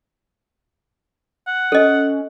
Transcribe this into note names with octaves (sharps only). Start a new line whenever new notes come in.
F#5
C#4 A4 D#5